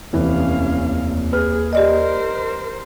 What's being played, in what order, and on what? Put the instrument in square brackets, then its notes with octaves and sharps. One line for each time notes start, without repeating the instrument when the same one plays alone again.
[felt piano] F1 E3 [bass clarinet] D#2 [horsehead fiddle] C#4 F5
[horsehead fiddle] G#4 [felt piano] B4 F6
[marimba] G4 D5 D#5 [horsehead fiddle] A#4 C5